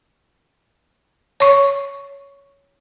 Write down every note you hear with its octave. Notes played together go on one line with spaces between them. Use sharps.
C#5 C#6